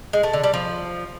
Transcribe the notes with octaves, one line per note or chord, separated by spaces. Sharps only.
G#3
A3
D3
G3
F3